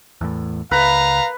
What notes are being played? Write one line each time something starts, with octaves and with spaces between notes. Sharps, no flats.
E2 A2
C#2 B4 F5 A#5